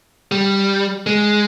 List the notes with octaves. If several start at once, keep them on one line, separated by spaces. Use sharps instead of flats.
G3
G#3